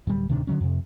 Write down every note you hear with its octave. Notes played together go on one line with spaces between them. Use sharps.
D1 G3
D1 C3 D#3 D4
D3 E3 F#3 C#4
F2 C3